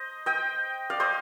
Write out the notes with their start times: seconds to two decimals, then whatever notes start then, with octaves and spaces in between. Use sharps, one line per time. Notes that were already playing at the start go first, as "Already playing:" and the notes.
Already playing: C5 D#5
0.26 D#5 G5
0.90 D5 F5
1.00 C5 D#5